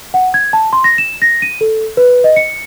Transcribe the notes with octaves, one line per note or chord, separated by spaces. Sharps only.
F#5
G#6
A5
C6
A#6
E7
A#6
D#7
A4
B4
D#5
C#7